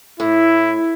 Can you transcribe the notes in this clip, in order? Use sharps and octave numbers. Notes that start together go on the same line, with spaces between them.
A2 E4